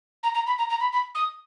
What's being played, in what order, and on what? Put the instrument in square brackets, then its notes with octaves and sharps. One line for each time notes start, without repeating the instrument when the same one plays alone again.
[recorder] A#5
A#5
B5
A#5
A#5
B5
B5
D#6